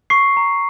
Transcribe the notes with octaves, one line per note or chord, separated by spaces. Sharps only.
C#6 C7
A#5